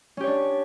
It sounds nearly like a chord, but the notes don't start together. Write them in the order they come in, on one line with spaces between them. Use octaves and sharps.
C#4 G4 C#5 D4